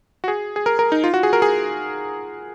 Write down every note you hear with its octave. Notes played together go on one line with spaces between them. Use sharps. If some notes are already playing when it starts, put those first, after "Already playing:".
F#4
G#4
G#4
A#4
A#4
D#4
F4
F#4
G#4
A#4
G#4